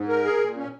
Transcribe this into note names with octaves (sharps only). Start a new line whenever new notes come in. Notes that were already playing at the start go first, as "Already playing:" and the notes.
Already playing: G#2
A#4
G#4
A#2
C#4